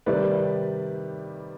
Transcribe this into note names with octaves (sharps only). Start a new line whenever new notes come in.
C3 D#3 G3 B4 D5